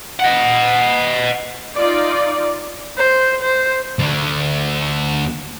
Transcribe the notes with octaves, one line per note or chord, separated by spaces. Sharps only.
D#5 F#5
D#4 F4 D5
C5
C5
D2 D3